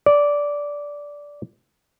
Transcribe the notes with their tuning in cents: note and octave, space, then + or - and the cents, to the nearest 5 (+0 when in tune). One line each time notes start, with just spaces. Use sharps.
D5 -10